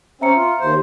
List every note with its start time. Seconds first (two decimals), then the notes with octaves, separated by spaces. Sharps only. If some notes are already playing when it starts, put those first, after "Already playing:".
0.21 C4 C#4 E5 A#5 C#7
0.36 F4
0.60 D#2 C5